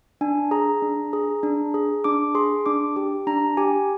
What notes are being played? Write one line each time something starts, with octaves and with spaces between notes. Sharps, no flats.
D4 G#5
G#4 A#5
D4
G#4
D4
G#4
D4 D6
G#4 C6
D4 D6
G4
D4 A#5
G4 G#5